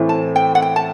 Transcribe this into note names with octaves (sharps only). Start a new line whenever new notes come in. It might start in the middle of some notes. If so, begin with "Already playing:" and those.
Already playing: A2 E3 A3 C4
A5
G5
F#5
G5
A5